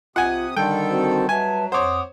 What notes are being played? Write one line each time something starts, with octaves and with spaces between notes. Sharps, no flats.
B1 C3 F4 F#5 G#5 D#6
D3 D#3 G3 A4 G5
C4 F#4 C5
F#3 B4 E5 G#5 A5
F2 C5 C#5 F#5 D6 D#6